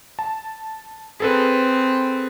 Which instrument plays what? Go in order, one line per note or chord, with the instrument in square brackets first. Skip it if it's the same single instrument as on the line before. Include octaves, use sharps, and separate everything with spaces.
[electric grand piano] A5
[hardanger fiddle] C4 [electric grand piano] G#4 A4 B4